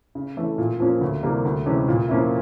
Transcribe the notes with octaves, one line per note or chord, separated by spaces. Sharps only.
C#3
E3 A3 C#4
A#2
F3 A#3 C#4 F4
D2
C3 E3 G3 A#3
D2
C3 E3 G#3 C#4
A#2
F3 A#3 C#4 E4